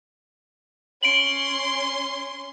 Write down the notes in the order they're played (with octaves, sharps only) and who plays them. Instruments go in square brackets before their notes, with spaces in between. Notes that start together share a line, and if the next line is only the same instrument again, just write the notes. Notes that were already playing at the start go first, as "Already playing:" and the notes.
[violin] C#4 C6 [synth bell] D7 F#7